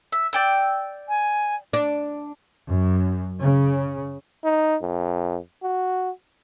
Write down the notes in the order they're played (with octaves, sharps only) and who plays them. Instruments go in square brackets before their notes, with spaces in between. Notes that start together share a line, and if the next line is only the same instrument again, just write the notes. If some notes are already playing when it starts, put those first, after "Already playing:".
[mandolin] E5
D5 G5 E6
[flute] G#5
[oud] D4
[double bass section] F#2
C#3
[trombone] D#4
F2
F#4